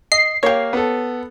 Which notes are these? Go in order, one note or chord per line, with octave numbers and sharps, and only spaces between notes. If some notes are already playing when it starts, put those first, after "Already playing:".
D#5 C7
A#3 G4 C#5 F5
B3 A4